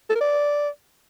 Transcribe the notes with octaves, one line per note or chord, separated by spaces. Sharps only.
A4
A#4
D5